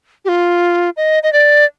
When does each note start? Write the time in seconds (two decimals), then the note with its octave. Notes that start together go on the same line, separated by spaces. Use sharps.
0.25 G4
0.29 F4
0.97 D#5
1.23 D#5
1.33 D5